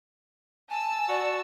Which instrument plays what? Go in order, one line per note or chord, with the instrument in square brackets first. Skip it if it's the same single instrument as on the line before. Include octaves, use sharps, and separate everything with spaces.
[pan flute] G#5 [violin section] A5 E6
[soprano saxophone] F#4 [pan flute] D5